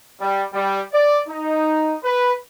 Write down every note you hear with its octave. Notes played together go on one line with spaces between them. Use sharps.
G3
G3
D5
D#4
B4